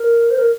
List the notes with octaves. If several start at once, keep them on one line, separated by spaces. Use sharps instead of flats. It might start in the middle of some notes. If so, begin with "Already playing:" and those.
Already playing: A#4
C5
A#4